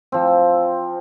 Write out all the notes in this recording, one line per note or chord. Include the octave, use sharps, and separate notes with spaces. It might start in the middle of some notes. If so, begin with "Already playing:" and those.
F3 C4